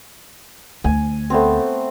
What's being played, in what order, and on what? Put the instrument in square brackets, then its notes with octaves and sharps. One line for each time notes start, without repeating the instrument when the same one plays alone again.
[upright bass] D2 [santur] G#5
[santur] A3 B3 C4